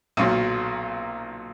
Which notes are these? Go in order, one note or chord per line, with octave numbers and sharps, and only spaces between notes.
B1 A#2 F#3